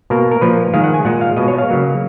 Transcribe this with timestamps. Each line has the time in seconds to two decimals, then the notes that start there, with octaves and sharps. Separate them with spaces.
0.10 B2 A#3 A#4
0.31 A#4
0.41 A#2 F3 A#3 B4
0.74 D#3 G#3 F5
0.84 F#5
0.94 G#5
1.05 A#2 G#3 F#5
1.21 F5
1.37 B2 G#3 D#5
1.48 C#5
1.58 F5
1.68 C#3 F#3 A#3